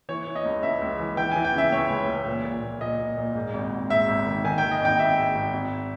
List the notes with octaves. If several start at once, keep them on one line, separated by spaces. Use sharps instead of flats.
E3 C#5
E3
D#5
C#2
C#2 E5
C#2
E3
E3 G5
E3 G#5
G5
C#3 E5
C#2 C#5
C#2
C#2
A#2
A#2
A#1
A#2 D#5
A#2
A#2
G#2
G#1
G#1
G#2 E5
G#1
D#3
D#3 G#5
D#3 G5
D#5
G#1 G5
G#1 E5
G#2
G#1
G#1